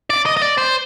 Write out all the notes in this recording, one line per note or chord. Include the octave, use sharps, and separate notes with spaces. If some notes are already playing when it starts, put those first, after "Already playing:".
D5
D#5
D#5
D5
C5